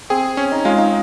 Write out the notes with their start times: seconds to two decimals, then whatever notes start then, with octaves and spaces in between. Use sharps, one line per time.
0.10 C4 G#4
0.37 C#4
0.52 D#4
0.65 G#3 F4
0.78 D#4